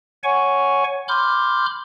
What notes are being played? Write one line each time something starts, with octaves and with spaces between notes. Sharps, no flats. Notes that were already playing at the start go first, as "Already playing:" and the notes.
C#5 F#5 G#5 C#6
B5 C6 D6 F6 G6